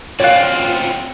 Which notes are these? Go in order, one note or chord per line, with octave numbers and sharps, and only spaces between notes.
C4 C#4 F4 F#4 C#5 D5 F5 F#6